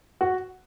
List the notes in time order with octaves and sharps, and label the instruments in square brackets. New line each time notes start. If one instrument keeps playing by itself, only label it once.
[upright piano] F#4